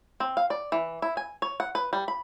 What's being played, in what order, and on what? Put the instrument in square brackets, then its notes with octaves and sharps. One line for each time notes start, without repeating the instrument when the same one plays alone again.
[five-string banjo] C4
F5
D5
E3
E4
G#5
C#5
F#5
B4
G3
B5